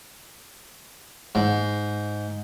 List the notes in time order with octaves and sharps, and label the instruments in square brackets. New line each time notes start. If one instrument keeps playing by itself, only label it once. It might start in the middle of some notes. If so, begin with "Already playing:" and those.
[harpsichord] G#2